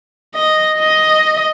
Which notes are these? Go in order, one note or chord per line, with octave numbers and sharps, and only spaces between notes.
D#5
D#5